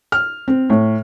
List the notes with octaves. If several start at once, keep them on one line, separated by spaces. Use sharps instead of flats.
F6
C4
A2